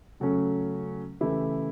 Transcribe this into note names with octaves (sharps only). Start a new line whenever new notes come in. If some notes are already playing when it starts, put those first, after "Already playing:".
C#3 F#3 A3 C#4
C#3 E3 A3 E4 G4